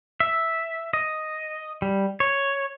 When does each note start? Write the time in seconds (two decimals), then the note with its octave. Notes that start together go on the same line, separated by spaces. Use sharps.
0.20 E5
0.93 D#5
1.82 G3
2.20 C#5